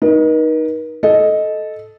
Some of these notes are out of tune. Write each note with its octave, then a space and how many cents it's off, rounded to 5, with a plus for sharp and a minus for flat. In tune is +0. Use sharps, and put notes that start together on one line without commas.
D#4 +0 A#4 +45
A4 -10 D#5 +0